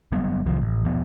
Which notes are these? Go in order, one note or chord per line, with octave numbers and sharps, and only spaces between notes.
G1 F#3 G3 B3
C2 D#3 F3
A1
E1 F3 B3